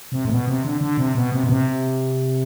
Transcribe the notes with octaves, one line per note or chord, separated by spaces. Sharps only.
C3
A2
B2
C3
D3
D3
C3
B2
C3
B2
C3